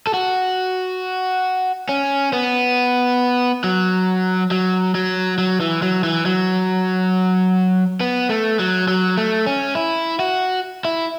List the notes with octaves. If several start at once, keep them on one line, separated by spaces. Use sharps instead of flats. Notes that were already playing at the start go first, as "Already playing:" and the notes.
A4
F#4
C#4
B3
F#3
F#3
F#3
F#3
E3
F#3
E3
F#3
B3
A3
F#3
F#3
A3
C#4
E4
F#4
E4